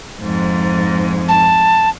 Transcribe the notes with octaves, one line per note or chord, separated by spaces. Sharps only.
F2 G#2
A5